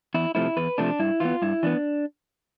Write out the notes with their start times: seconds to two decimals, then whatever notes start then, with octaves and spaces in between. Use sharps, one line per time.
0.14 E2 E4
0.35 C3 F3 A3 E4
0.57 E2 B4
0.78 C3 F3 A3 D4
0.99 G2 E4
1.20 E3 B3 F4
1.42 G2 E4
1.63 E3 B3 D4